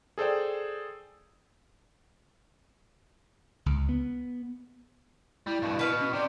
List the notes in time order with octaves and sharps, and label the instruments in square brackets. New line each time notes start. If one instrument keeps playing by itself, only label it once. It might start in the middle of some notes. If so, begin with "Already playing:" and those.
[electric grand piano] G#4 A4 C5 D5 G5
[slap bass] C#2
B3
[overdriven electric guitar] G3 [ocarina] E4
[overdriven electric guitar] G2 B2
[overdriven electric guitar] B2 [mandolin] B4 F5 C#6
[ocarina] C#4
[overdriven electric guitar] C3 G4 [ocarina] D5